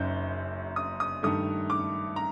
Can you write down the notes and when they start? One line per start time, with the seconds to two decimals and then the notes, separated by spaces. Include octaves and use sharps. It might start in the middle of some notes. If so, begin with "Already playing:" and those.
Already playing: F#1 F#2 F#3 D#4 G6
0.76 D#6
1.00 D#6
1.23 G2 D#3 A3 D#6
1.70 D6
2.16 A#5